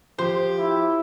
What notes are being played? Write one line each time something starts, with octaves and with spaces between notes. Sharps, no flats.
F3 G4 C5
E4